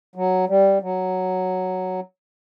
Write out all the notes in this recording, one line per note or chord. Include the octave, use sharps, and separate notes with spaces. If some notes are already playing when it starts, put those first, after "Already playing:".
F#3
G3
F#3